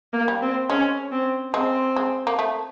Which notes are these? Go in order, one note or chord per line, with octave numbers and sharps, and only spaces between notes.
A#3
G3
C4
G#3 C#4
C4
G#3 C4
G#3
A#3
A3